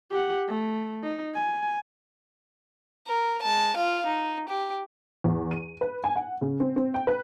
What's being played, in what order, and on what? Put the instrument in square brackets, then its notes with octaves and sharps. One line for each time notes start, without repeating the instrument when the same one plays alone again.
[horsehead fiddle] G4 F#5
A3
D#4
G#5
[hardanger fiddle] A#4
G#3 A5
F4 F5
D#4
G4
[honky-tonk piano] E2
D#7
B4
G#5
F#5
C#3
C4
C4
G5
B4